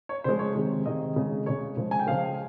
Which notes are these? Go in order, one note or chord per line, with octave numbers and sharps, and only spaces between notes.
C#5
C#3 F3 G#3 C5
C#5
C3 D#3 G#3
C3 D#3 G#3 D#5
C#3 G#3
C#3 G#3 C#5
C#3 F3 G#3
G#5
G5
C#3 F3 G#3 F5